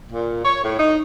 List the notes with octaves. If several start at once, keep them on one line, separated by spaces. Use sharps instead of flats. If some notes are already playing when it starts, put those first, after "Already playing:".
A#2
C#5
A2
D#4